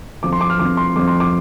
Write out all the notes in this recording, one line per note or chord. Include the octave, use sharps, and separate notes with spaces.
F2 F3 C4 D6
C6
D6
F6
F2 F3 C4 D6
C6
F2 F3 C4 D6
C6
D6